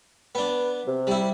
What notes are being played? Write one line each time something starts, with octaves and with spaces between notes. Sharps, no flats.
B3 D4 B4
C3
G3 E4